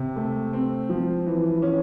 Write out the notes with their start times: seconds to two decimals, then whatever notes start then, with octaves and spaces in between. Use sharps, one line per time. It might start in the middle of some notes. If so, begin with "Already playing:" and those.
Already playing: C3
0.16 A3
0.53 C4
0.89 F3
1.26 E3
1.62 C#4